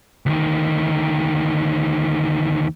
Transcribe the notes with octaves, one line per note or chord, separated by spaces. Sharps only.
D2 D#3